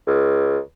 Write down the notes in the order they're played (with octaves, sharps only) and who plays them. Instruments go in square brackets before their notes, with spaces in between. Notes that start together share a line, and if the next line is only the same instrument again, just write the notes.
[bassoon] C#2